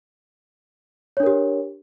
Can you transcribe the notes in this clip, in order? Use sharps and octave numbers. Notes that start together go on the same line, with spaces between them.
D4 G4 A#4 C#5